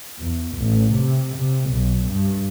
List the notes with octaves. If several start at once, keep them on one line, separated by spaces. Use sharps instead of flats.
E2
A1
C3
C3
B1
G2